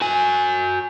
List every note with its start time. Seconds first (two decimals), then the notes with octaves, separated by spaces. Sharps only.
0.01 F#4 G#5